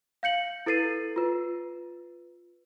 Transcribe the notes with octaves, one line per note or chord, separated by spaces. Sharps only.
F5 G6 C#7 F#7
E4 A4 B4 A6 C7 D#7
F4 B4